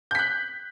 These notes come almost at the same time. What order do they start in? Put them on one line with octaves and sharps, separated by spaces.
G6 B6 F#6